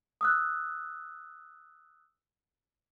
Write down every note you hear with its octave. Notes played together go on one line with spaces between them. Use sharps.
D#6 E6 F#6